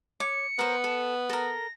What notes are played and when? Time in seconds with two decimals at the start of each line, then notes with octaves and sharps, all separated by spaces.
0.20 C#5 D6 C#7
0.59 B3 A#4 C5
0.84 A4
1.29 A4 A#4 A#6